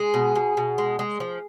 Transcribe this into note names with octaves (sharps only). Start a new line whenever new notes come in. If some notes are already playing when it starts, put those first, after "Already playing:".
Already playing: G#3 G#4
B2
B2
B2
G#3
G#3
F3